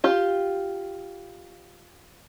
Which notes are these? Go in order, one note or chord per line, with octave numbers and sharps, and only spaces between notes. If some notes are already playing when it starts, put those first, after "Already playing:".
F4 G4